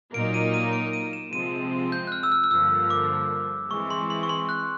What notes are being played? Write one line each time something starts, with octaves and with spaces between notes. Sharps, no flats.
A#2 F#3 A#3 D#4 D7
D#7
D#7
D7
D#7
E7
C3 F3 G#3 C4 D#7
G6
F#6
F6
E6
F6
F6
G2 D3 F3 A#3 E6
D6
E3 G#3 C4 C#6
C6
C6
C#6
C6
F#6